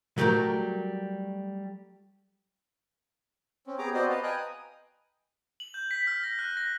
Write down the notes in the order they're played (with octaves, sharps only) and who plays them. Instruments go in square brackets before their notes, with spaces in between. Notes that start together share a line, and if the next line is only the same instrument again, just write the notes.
[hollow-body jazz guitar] F#3 G3 A3 G4 A#4
[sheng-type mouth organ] C4 C#4
B3 G4 G#4 A#5 D6
B3 C4 F#4 C5 D5 D#5
B4 D#5 F5 A5
B4 D#5 G5 G#5 A#5 F#6
D#6
[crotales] F#7
G6
B6
F6
A#6
F#6
A#6